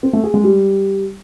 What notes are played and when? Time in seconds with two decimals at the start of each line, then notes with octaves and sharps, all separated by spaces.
0.03 C4
0.13 A3
0.24 G#4
0.34 G#3
0.44 G3